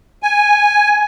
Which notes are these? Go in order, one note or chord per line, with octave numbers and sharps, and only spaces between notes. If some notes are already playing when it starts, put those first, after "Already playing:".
G#5